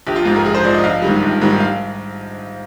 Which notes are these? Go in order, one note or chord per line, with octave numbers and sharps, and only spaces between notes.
A#1 G4
F4
G#2 F3 G4
A#4
A#1 G#4
C5
G#2 F3 D5
D#5
A#1 F5
G#2 D#3 G3
A#1
G#2 D#3 G3
F5